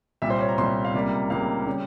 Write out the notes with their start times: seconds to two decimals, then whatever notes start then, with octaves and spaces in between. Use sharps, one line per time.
0.22 C2 A#2 G3 E5
0.30 C5
0.40 C#5
0.49 A#5
0.58 C2 A#2 G3 C6
0.85 F5
0.94 C#2 C3 G3 A#3
1.30 C#2 C3 G3 A#3 F5
1.67 C#3 G3